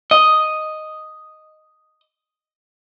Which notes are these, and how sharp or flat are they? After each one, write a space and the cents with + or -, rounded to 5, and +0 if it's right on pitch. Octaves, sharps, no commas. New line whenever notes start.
D#5 +0